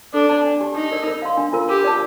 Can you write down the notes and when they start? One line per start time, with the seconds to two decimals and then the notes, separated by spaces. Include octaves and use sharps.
0.14 D4 A4
0.29 D5 A5
0.45 D4
0.61 G4 D5 A5
0.76 D#4 G4
0.91 A#4 D5
1.07 A#4
1.22 F5 C6
1.38 D4
1.53 F4 A#4
1.69 G4 A#4
1.84 D5 A5